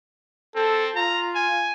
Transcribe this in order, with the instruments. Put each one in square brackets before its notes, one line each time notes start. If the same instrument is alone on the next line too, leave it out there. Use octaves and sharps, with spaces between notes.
[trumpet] C4 [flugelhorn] A4
[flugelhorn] F4 [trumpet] A#5
[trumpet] G#5